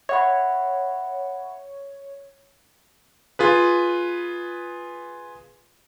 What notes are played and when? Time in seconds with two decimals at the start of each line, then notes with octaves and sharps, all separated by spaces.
0.09 C#5 E5 F#5 B5
3.39 F4 G#4 B4